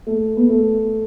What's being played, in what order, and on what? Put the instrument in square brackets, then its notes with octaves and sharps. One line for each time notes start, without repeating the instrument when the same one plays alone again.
[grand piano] A3
B3
A3